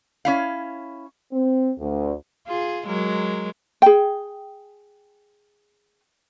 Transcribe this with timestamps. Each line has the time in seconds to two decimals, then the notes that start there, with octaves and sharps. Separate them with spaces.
0.25 C#4 E4 F5
1.32 C4
1.78 D2
2.47 F4 G#4
2.86 F#3 G#3 A#4
3.82 G#4 G5